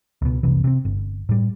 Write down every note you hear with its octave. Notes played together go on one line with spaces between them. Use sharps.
C#2 B2
F1 C2 C3 E3
C3 C4
G1
A2 G3